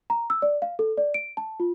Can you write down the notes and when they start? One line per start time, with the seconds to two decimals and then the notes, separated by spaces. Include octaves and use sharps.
0.10 A#5
0.30 E6
0.42 D5
0.62 F5
0.79 A4
0.97 D5
1.14 D7
1.37 A5
1.60 F4